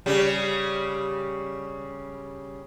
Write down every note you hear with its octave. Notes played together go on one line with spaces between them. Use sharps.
C#3 G3